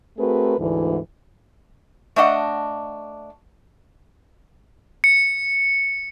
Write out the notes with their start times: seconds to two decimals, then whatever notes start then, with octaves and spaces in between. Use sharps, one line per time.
0.19 A3 C4 F#4 G#4 A#4 B4
0.59 D2 G#2 E3
2.16 A3 D4 D#5 F#5
5.04 C#7